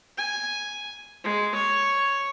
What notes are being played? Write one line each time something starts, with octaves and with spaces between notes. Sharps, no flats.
G#5
G#3
C#5